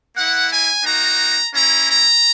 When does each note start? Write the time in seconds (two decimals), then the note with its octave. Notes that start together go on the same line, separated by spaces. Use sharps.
0.16 A#3 E4 F#5
0.50 G#5
0.84 A#3 D#4 F#4 A#5
1.53 A#3 C#4 E4 A#5
1.89 A#5